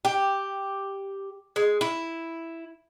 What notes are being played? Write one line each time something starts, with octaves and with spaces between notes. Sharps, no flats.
G4
G#3
E4